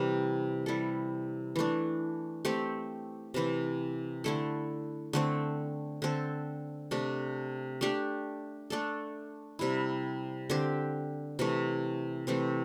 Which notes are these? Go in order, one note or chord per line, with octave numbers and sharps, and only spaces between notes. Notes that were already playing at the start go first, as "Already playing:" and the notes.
Already playing: C3 E3 G3
G3 E4 A4
E3 A3 D4
A3 C4 G4
C3 E3 C4
D3 A3 E4 A4
D3 A3 C4
D3 C4 A4
C3 A3 D4
A3 D4 G4
A3 D4 A4
C3 G3 E4
D3 C4 G4
C3 E3 A3
C3 E3 A3 C4